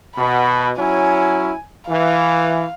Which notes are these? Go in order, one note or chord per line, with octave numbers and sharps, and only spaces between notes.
B2 B5
F#3 C#4 E4 G#5
E3 F5